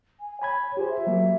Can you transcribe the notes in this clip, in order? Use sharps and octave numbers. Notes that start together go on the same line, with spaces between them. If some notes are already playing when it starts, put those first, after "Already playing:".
G#5
C#5 G#5 B5 G#6
F4 G4 G#4 C5
E5
F#3 A#3